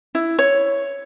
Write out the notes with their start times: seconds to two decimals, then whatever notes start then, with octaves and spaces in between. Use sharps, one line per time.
0.15 E4
0.39 C#5